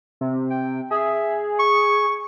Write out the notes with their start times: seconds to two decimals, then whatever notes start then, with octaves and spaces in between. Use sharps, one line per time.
0.21 C3
0.50 G5
0.91 G#4 E5
1.59 C#6